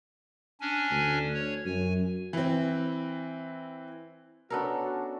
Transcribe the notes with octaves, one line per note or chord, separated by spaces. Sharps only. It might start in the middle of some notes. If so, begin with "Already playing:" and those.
C#4 D4 G#5
D2
C#5
F#2 G#5
E3 C4
B3 C#4 D4 F#4 A4 A#4